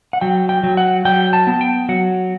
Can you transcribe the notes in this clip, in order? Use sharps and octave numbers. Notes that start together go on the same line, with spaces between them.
F#5
F#3 G5
G5
F#3
F#5
F#3 G5
A5
B3
G5
F#3 F#5